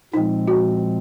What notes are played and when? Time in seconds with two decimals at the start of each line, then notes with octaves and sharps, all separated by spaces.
0.14 A#2 F3 G#3 C4 D#4
0.48 F#4